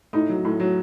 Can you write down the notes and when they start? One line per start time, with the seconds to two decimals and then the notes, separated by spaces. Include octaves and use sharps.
0.13 A2 D#4
0.29 F#3
0.45 A2
0.60 F#3